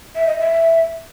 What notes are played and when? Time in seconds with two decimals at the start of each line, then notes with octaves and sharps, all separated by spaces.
0.15 E5
0.26 D#5
0.38 E5